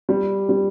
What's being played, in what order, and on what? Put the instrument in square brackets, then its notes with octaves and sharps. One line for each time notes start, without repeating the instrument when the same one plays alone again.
[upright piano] G3
G3